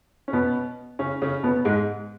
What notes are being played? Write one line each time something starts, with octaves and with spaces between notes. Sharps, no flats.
C#4
B2 B3
C#3 C#4
C#3 C#4
B2 B3
G#2 G#3